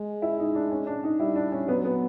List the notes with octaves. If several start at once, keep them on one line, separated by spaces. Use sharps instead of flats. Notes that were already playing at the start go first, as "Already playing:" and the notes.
Already playing: G#3
E4
D#4
D4
C#4
D4
D#4
G3 E4
D4
C#4
F#3 B3
B3